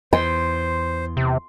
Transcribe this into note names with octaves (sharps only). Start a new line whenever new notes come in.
E2 C5 C6
C3